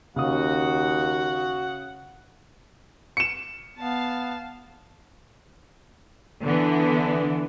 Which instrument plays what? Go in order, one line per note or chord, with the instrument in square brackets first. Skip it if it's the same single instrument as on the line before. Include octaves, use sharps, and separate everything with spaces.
[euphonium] D#2 [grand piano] C#3 D#6 [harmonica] F#4 F#5
[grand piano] C#7 E7
[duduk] B3 [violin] F5 A5
[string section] D3 E3 B3